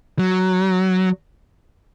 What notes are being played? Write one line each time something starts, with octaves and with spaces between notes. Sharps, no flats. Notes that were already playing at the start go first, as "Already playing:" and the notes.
F#3